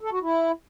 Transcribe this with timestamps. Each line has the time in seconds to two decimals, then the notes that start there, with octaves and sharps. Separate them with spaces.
0.01 A4
0.12 F#4
0.22 E4